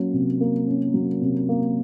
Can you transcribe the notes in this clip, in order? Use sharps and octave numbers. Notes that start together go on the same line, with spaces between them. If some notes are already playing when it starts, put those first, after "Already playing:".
Already playing: F#3 A#3 C#4
C3
A#3
C#4
F#3
C3
A#3